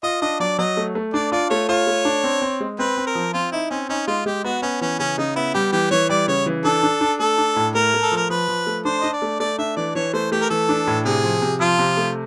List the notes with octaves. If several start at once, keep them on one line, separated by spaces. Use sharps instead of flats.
F4 D#5
D4 D#5
F#3 D5
F#3 D#5
A3
A3
D4 D5
F4 D5
A3 C#5
F4 C#5
A3
D4
C4
C4
G#3
C4 B4
C4
A#4
F3
C4 F4
D#4 E4
C4 C#4
C#4 D#4
G#3 F4
G#3 G4
B3 F#4
B3 C#4
E3 C#4
C#3 C#4
C#3 D#4
B3 E4
G3 G4
E3 G4
E3 C#5
G3 D5
C#3 C#5
E3
D4 A4
D4
D4
A3 A4
D4
A2
A3 A#4
A3
A4
F3 A#4
F3 B4
F3
A3
D4 C5
D4 D#5
D5
A3
A3 D5
D4 E5
E3 D5
E3 C#5
A3 C5
A3 G4
A#4
E3 A4
D4
A2
C3 G#4
F3
C3
F3 F4
C3
A3